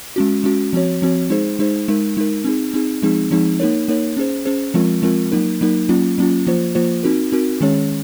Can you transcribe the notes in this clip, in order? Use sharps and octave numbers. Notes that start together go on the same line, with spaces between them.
G#3 C#4 F#4
G#3 C#4 F#4
F3 C4 F#4 C#5
F3 C4 F#4 C#5
G#3 D#4 G#4 C5
G#3 D#4 G#4 C5
G#3 D#4 A#4
G#3 D#4 A#4
C4 D#4 G#4
C4 D#4 G#4
F3 G#3 C4 D#4 G#4
F3 G#3 C4 D#4 G#4
A#3 D#4 A#4 C#5
A#3 D#4 A#4 C#5
C#4 G#4 C5
C#4 G#4 C5
F3 G#3 C4 F4 A#4
F3 G#3 C4 F4 A#4
F#3 A#3 D#4 A#4
F#3 A#3 D#4 A#4
F#3 A#3 C#4 F4
F#3 A#3 C#4 F4
F3 A#3 F4 C5
F3 A#3 F4 C5
C4 D#4 F#4 A#4
C4 D#4 F#4 A#4
D#3 G#3 C#4 G#4 C#5